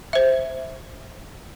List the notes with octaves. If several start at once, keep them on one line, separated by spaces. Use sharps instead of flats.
C5 E5